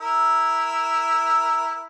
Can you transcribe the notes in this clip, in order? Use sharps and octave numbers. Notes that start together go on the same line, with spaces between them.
E4 A#4 E6